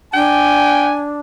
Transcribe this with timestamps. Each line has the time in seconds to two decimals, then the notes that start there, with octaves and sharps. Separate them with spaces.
0.14 D4 G5 G#5